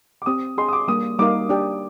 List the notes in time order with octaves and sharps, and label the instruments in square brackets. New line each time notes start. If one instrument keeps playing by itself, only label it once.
[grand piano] D6
[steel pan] C4 G4 C5 [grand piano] D#6
[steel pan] D4 G#4 D#5 G5 [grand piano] C6
[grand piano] D#6
D6
[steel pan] G3 A#3 D4 [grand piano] D#6
[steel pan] G3 A#3 D#4 A#4 F5 [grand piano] D6
[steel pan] D4 G4 D5 G5